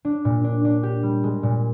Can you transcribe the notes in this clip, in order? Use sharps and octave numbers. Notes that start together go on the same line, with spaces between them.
D4
A#2
D4
D4
G4
G3
G#3
A#2